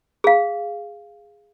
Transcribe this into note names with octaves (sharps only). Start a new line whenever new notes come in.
G#4 F5